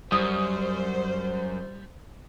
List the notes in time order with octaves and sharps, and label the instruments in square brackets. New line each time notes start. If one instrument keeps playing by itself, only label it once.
[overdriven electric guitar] F#2 [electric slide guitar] G3 [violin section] C5 [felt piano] D#6